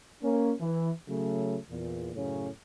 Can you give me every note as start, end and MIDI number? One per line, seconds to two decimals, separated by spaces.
0.23 0.53 58
0.23 0.53 61
0.60 0.91 52
1.08 1.57 49
1.08 1.57 54
1.08 1.57 57
1.70 2.10 40
1.70 2.10 46
2.15 2.48 42
2.15 2.48 45
2.15 2.48 49
2.15 2.48 61